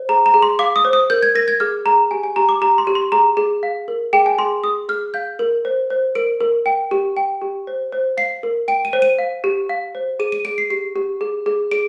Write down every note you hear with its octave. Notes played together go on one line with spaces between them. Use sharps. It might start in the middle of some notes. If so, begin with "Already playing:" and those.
Already playing: C5
G#4 A#5
A#5
G#4
C6
F5 D6
D#6
C5
D#6
A#4 G6
G#6
A#4 A#6
G#6
G#4 F6
G#4 A#5
G4 G#5
G#5
G4 A#5
D6
G4 A#5
C6
G4
C6
G#4 A#5
G#4
F5
A#4
G#4 G5
G#5
G#4 C6
G#4 D#6
G#4 F6
F5 G6
A#4
C5
C5
A#4 D7
A#4
G5
G4
G5
G4
C5
C5
F5 C7
A#4
G5 D7
D#7
C5
D#7
F5
G4
F5
C5
G#4 D#7
D#7
G#4 D7
C7
G4 C7
G4
G#4
G#4
G#4 D7